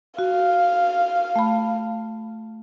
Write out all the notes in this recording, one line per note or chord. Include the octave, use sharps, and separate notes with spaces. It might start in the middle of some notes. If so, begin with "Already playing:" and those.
F#4 F5
A3 B5